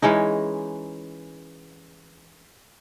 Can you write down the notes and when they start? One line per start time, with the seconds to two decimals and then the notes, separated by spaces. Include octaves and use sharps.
0.02 E3 G#3 C#4 D#4